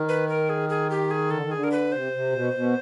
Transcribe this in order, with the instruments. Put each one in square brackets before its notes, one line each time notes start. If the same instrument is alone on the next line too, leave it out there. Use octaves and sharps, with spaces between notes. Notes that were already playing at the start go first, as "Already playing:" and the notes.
Already playing: [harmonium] D#3
[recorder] B4
A#4
G#4
G#4
G4
G#4
[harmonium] D3 [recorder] A4
[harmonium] D#3
[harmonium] D3 [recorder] G#4
[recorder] A#4
B4
[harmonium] C3 [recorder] C5
[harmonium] C3
B2
B2